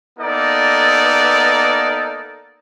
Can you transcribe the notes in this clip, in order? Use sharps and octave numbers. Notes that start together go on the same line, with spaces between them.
A#3 B3 D#4 A4 D5